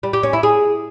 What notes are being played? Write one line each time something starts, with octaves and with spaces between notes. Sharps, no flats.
G3
G4
C#4
E4
G#4